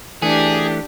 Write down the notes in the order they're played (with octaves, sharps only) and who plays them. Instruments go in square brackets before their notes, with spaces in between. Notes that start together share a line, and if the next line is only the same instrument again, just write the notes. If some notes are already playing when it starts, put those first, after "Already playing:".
[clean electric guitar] E3 A3 [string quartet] D4 G4 [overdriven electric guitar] G#4